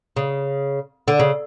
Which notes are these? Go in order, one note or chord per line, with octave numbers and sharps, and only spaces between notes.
C#3
D3
C#3